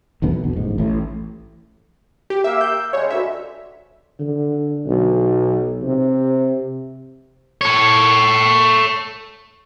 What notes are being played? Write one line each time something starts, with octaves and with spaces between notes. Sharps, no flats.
B1 E2 D3 B3
B1
A1 G#2
A1 A2
G4
A#3 E5 G5 E6
G6
C#3 G3 G#3 C#5
D2 E5
D3
B1
C3
A4 C#5